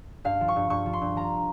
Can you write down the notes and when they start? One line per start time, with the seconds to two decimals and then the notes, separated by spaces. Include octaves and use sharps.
0.24 G2 F5
0.41 F3
0.48 C#6
0.56 G2
0.70 G2 C#6
0.86 F3
0.93 C6
1.02 G2
1.16 F3 A#5